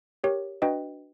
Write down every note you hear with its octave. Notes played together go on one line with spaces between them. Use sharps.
G4 A#4 C#5
D4 F#4 B4 D#5 G5